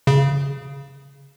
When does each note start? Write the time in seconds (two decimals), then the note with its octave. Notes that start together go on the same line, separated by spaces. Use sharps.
0.07 C#3